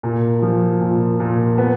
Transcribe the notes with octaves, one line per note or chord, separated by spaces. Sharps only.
A#2
F3
A#2
A#2
B3